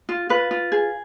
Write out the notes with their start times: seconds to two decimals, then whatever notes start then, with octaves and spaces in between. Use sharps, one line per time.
0.09 F4
0.29 F4 B4
0.51 F4
0.72 G#4